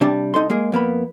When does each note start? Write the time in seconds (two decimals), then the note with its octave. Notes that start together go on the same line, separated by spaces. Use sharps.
0.01 C3 G3 D4 A5
0.34 C2 D#4 A4 C6
0.50 G#3 A#3 G#4
0.72 F2 A#3 B3 B5